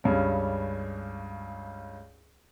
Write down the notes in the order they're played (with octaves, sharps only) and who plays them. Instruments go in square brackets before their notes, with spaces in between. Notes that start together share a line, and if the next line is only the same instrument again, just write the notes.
[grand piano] C#2 G2 C#4